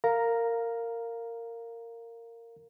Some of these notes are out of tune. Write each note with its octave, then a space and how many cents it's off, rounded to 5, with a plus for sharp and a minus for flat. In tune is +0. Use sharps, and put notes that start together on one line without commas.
A#4 -15 F5 +0 A#5 +0